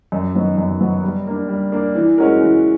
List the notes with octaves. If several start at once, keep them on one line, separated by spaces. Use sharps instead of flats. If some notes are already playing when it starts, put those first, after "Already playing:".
F#2
D#3 F#3 B3 D#4
F#2
D#3 F#3 B3 D#4
G3
A#3 D4
G3
A#3 D4
E3
G#3 C#4 F#4 A#4
E3